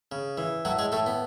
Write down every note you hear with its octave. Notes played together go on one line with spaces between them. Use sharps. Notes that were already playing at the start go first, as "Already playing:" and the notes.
C#3
E3
A2 F#3 F#4
G#3 G#4
A2 A3 A4
B3